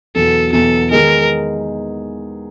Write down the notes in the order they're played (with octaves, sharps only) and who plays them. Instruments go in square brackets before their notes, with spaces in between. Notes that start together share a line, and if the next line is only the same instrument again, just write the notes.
[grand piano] E2 B2 F#3 B3 [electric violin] A4
[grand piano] E2 B2 F#3 B3 [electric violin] A4
[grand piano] D#3 G#3 B3 D#4 G#4 [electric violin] A#4